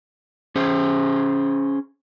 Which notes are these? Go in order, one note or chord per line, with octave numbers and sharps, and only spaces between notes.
C#4 G#4 C5